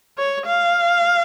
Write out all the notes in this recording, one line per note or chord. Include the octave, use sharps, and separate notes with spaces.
C#5
F5